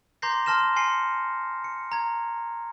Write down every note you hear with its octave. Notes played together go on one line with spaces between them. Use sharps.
A#5 C6 D6 G6 A#6 C7
A5 C6 F6 A#6 E7
G#5 C6 C7 C#7
C#7
A#5 G#6